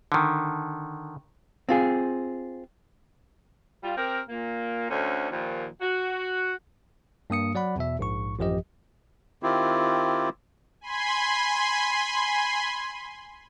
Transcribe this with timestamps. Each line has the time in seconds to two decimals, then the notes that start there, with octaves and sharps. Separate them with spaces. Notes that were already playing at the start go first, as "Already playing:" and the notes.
0.12 D3 D#3
1.69 C4 F4 G#4
3.83 G3 F4
3.97 C4 G4 A#4
4.29 A#2 A#3
4.90 D2 D3 C#4 C5
5.31 D#2 A#2 D#3 F3
5.82 F#4
7.30 G2 A#3 D#6 C#7
7.55 F#3 D5 F#5 B5
7.76 E2 B2 E5
7.99 A#1 G#2 C#6
8.39 A1 F#2 F3 G4 D#5
9.43 D#3 C4 E4 F4 G4
10.81 G#5 B5 C6